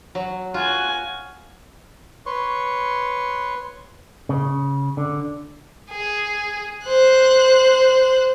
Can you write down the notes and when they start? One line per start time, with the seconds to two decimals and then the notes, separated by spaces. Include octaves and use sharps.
0.15 F#3
0.54 F4 F#4 G#5
2.26 B4 C#5 C6 C#6
4.29 C#3
4.97 D3
5.91 G#4
6.85 C5 F#6